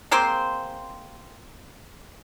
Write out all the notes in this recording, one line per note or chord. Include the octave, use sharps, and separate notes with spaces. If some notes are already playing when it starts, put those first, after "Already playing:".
G#3 A#3 C4 C5